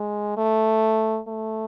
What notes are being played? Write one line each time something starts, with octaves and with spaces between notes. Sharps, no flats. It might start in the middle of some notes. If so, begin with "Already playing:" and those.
Already playing: G#3
A3
A3